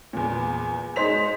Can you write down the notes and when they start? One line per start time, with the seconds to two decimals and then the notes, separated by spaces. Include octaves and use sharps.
0.13 E2 A#2
0.96 G#3 D#4 C5 B6 F7